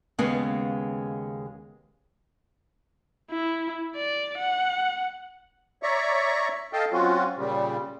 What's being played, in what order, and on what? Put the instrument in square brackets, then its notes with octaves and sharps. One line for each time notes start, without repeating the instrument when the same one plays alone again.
[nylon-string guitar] D#2 C#3 G#3 B3 F5
[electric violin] E4
D5
F#5
[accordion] C#5 D5 E5 A#5 C#6
A4 D#5 F5 G5 A5
F#3 C4 C#4 F4 F#4
A#2 C#3 G3